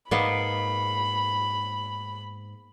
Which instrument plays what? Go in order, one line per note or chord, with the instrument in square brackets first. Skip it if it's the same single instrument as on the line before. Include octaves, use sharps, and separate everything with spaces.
[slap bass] G#2 [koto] A#3 B3 D#4 [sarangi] B5